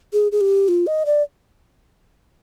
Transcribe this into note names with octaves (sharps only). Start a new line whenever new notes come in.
G#4
G#4
G4
F4
D#5
D5